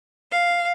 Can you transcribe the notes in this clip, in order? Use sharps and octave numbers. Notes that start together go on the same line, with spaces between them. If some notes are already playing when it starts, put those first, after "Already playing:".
F5